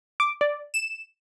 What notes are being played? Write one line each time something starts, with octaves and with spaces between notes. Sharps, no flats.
D6
D5
E7